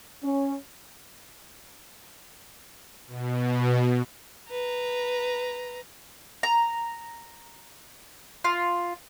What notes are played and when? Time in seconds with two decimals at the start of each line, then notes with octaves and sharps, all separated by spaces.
0.23 C#4
3.07 B2
4.51 B4 A#5
6.43 A#5
8.44 F4